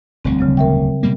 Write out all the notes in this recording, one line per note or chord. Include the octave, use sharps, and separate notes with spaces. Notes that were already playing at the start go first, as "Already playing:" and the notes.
E1 D2 G3 C4
C#3 F#3 C4
A#4 E5 G5
B2 G3 A#3